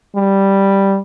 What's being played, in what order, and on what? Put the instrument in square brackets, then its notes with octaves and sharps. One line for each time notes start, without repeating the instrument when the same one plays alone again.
[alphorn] G3